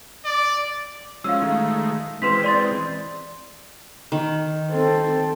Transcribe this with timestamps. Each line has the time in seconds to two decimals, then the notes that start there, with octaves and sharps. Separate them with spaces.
0.25 D5
1.24 F3 G#3 C#4 F5 E6
1.42 D#3 G#3 A3
2.22 E3 G#3 C4 B4 C6 B6
2.44 D5 C6 A6
4.12 D#3
4.71 C4 A4